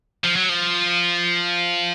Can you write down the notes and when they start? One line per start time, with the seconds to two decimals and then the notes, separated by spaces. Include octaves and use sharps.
0.24 F3
0.36 F#3
0.49 F3